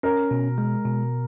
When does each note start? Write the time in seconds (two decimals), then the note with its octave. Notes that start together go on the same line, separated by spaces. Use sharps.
0.03 C#4 A#4
0.31 B2
0.58 G#3
0.85 B2